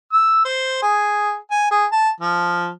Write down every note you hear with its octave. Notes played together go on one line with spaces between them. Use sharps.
E6
C5
G#4
G#5
G#4
A5
F3